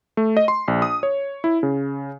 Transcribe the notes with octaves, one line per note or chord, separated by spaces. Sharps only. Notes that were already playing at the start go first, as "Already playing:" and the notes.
A3
D#5
C6
A#1
D#6
C#5
E4
C#3